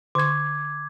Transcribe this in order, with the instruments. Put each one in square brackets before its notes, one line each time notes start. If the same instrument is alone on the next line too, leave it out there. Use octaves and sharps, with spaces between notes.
[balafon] D3 C#6 [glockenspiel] D6 G#6